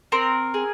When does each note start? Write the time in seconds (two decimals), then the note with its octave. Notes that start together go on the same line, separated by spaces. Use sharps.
0.12 C4 A#4
0.54 G#4